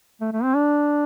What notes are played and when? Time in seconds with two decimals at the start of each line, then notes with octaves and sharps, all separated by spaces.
0.21 A3
0.33 A3
0.44 C4
0.56 D4